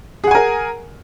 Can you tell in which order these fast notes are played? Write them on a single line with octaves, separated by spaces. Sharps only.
G#4 F#5 G#5 A#4